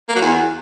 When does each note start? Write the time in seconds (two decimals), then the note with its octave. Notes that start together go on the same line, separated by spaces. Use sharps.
0.09 A#3
0.15 F#3
0.21 E2